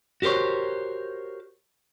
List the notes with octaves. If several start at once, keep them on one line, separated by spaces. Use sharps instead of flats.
F#4 G4 A#4 C5 C#5